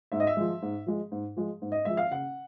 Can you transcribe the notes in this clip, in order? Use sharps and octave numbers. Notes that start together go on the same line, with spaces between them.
G#2 E5
D#5
E5
F3 G#3
G#2
F3 G#3
G#2
F3 G#3
G#2
D#5
F3 G#3 E5
F5
C#3 F#5